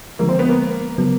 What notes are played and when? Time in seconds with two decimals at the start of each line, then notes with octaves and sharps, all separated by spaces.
0.19 D3 F3 G#3 A#3
0.29 C4
0.39 B3
0.49 A#3
0.98 C#3 F#3 B3